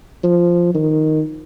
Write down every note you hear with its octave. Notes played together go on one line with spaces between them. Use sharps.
F3
D#3